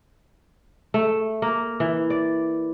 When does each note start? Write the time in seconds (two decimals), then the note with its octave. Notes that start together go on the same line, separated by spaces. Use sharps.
0.94 A3
1.42 A#3
1.80 E3
2.10 D5